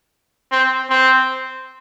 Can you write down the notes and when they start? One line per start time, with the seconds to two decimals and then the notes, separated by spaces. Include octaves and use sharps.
0.51 C4
0.89 C4